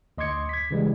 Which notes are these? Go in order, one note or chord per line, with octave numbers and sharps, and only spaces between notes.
D2 D#5 C6 D6 G#6 C#7
G#6 B6
C#3 E3 G3 G#3